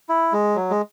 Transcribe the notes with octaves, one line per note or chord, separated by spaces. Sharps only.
E4
G#3
F#3
G#3